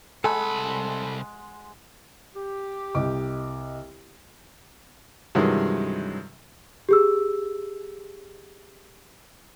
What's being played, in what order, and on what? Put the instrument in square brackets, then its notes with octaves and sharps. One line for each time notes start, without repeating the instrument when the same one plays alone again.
[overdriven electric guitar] C2 B5 [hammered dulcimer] G#3 F#5 [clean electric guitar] A4 [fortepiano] G#5
[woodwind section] G4
[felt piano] C2 D#5 D6
[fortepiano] G2 C3 D#3 E3 F#3 G#3
[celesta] G4 G#4 E6